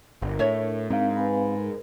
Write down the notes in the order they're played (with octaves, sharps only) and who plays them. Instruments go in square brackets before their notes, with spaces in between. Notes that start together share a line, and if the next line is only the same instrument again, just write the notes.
[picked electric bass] G1 [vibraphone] D4 A#4
[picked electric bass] A2 [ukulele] C#5 E5
[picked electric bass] G#2 [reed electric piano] C4 F5
[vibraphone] B4 G#5 B5
G#4 A#4